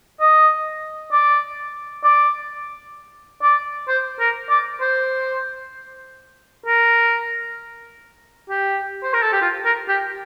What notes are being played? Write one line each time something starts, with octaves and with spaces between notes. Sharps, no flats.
D#5
D5
D5
D5
C5
A#4
D5
C5
A#4
G4
C5
A#4
A4
G4
F4
A#4
G4